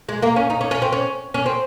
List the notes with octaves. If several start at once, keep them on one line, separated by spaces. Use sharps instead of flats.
G#3
A#3
C#4
D#4
C#4
C#4
C4
C#4
C#4
C4